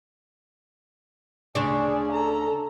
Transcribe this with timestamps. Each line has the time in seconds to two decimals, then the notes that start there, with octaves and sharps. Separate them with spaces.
1.55 D2 C#3 D4 G#4 D5
2.11 A4 A#5